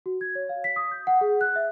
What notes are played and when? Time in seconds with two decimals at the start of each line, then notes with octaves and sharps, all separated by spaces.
0.06 F#4
0.21 G#6
0.35 C#5
0.49 F5
0.64 B6
0.76 D#6
0.91 G6
1.07 F#5
1.21 G#4
1.41 F#6
1.56 E5